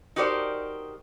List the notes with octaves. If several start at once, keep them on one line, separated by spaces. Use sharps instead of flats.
D#4 F#4 G4 A#4 C5 D5